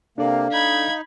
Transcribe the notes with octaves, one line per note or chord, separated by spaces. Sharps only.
C3 A#3 D4 A4 D5 F5
D#4 B5 G#6